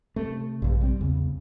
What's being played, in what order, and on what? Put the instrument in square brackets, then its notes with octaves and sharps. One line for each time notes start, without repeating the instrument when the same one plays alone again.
[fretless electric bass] C3 A3
[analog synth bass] A#1 [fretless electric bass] G2 C3
[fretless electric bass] G3 C4
[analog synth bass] E2 [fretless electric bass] C#3